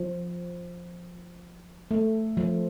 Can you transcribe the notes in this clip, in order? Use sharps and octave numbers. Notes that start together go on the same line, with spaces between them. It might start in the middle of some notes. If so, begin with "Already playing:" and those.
Already playing: F3
A3
F3